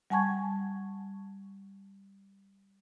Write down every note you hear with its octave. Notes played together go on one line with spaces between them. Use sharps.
G3 F#5 G#5 A5 C#6 G#6